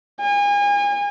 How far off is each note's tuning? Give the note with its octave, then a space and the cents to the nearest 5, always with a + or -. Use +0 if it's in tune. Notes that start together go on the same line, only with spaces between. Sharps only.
G#5 -35